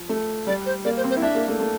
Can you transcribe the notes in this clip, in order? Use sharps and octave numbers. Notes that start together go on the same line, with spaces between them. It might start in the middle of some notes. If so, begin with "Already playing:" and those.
Already playing: F3
A3
G3 D5
C5
A#3 D5
C5
C4
C5
E4
D4 E5
A#3
A3
A3